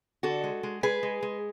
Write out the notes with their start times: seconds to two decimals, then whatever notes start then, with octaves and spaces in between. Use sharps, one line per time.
0.23 D3 F#4 A4
0.44 G#3
0.63 G#3
0.83 G#3 G#4 B4
1.03 G#3
1.23 G#3